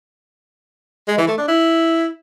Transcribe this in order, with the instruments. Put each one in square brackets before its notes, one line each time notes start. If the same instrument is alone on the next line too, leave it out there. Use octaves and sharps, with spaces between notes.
[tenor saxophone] G#3
E3
A3
D4
E4